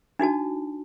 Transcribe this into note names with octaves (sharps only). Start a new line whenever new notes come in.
D4 D#4 F#4 A5